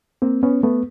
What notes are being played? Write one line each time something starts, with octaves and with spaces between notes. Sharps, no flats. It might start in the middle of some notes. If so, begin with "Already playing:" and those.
A#3 C4
B3 C#4
A3 B3